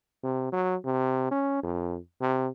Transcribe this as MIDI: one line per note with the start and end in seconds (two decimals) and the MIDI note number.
0.24 0.48 48
0.52 0.76 54
0.85 1.27 48
1.31 1.60 61
1.63 1.98 41
2.21 2.48 48